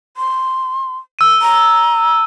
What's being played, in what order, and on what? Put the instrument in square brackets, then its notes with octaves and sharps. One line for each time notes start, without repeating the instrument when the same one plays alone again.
[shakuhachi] C6
[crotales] E6 D#7
[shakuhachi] A#5